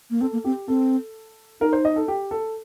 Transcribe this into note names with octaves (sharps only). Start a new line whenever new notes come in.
A#3
C4 A4
A#3
C4 G4
C4 A4
D#4 A#4
C5
D#5
A4
G4
A4